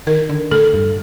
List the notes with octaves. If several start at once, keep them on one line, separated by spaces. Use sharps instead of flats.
D#3 A#4
D3
A2 A4
G2